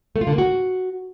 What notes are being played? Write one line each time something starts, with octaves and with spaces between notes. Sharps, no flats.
A3
F4
D3
A#3
F#4